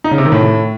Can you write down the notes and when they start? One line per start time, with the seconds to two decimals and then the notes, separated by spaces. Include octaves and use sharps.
0.04 D#4
0.11 C#3
0.18 C3
0.25 D#3
0.32 A2